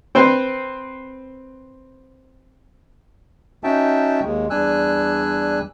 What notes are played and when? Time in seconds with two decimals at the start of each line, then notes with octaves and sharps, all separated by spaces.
0.15 C4 B4 C5 G5
3.64 C#4 D#4 F#4 E5 G5 A5
4.23 D#2 G#3
4.50 E2 G3 D4 G#5 E6 F#6